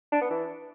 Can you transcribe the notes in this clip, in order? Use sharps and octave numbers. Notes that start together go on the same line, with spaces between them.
D4
B3
E3